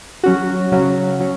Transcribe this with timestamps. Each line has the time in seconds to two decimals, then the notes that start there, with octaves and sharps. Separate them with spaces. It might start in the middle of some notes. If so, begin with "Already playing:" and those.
0.24 F#3 C#4 F#4
0.72 C#3 F#3 C#4 F#4
1.20 F#3 C#4